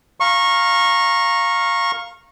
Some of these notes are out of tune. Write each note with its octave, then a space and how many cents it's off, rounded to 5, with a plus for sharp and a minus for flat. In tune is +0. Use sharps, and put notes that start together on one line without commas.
F5 +0 A#5 +0 C#6 -20